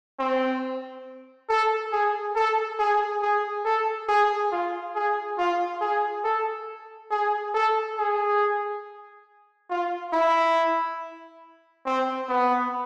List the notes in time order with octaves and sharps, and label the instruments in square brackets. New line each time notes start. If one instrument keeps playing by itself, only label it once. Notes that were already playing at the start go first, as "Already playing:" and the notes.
[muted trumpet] C4
A4
G#4
A4
G#4
G#4
A4
G#4
F4
G#4
F4
G#4
A4
G#4
A4
G#4
F4
E4
C4
B3